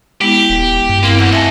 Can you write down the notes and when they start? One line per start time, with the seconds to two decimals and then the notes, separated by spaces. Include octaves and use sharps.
0.21 G#3 B3 E4 G4
0.50 D#1
0.89 G2
1.03 A#3 C4 E4
1.19 A2 E3 F#5 G6
1.33 D#5 E5 F#5 G#5 A5